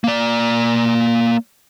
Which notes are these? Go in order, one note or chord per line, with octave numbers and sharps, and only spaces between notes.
A#3 D5